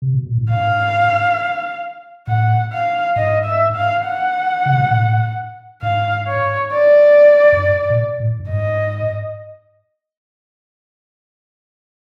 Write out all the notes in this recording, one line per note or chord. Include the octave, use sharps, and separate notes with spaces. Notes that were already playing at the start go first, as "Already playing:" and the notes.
C3
B2
A#2
A2
G#2 F5
A2 F#5
F5
G#2 D#5
E5
F5
F#5
C#3
C3
B2
A#2
A2
G#2 F5
C#5
D5
F#2
G2
A#2
A2
G2
G#2 D#5